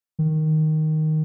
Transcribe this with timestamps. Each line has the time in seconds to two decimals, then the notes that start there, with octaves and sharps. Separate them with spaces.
0.19 D#3